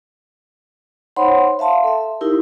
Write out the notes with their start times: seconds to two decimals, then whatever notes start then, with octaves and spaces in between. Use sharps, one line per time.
1.16 D#4 C5 C#5 F#5 B5 C6
1.59 E5 F5 A5 C6
1.84 A4 E5
2.21 D#4 E4 G4 A#4